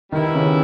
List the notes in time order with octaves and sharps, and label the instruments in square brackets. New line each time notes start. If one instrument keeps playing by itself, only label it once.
[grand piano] D#3 [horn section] G3 B3 E4
[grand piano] C#3